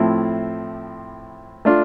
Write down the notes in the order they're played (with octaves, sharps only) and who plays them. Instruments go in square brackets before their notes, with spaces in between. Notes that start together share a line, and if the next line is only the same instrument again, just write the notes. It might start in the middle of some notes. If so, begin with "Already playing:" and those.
Already playing: [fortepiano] A2 F3 A3 C4 E4
A3 D4 F4